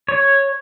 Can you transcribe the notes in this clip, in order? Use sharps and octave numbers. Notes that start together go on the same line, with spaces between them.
C#5